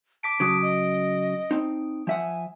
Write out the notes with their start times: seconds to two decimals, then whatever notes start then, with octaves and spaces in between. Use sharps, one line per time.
0.23 A5 D6 B6 D7
0.40 C#3 F#3 D#6 D7
0.62 D#5
1.51 C4 D#4
2.07 F3 E5 F#5 G#5